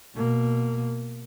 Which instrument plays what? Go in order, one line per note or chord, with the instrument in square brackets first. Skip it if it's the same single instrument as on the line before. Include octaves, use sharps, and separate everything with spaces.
[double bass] B2 A#3